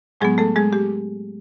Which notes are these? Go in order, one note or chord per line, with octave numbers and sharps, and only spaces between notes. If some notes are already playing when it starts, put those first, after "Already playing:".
A2 F#3 G#3 B3 G#4
A3 A4
G#3 G#4
G4